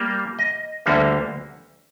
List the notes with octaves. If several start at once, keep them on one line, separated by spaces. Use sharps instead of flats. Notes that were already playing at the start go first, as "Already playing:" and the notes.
Already playing: G3 A#3
D#5
D2 D3 G3 A#3